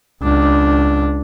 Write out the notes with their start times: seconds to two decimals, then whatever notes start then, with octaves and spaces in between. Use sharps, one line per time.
0.22 C#2 D4